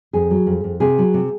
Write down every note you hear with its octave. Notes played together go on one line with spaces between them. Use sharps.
F2 G#4
F#3
F2
F2
C3 G#4
F#3
C3